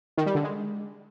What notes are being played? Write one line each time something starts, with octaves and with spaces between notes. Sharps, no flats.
D#3
G3
D3
G#3